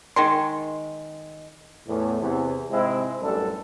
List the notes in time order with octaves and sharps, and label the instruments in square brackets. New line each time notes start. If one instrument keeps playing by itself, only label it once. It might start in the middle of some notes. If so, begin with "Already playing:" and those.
[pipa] D#3 G#3 C6
[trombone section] E2 A2
E2 C3
G#2 C3 G#3 C4 E4
A1 F#2 G3 D4 A4